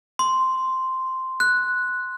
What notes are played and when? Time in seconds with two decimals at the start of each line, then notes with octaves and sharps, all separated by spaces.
0.19 C6
1.40 F#6